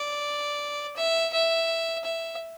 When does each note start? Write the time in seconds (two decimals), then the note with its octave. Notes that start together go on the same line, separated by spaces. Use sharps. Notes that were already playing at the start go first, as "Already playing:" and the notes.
Already playing: D5
0.96 E5
1.33 E5
2.04 E5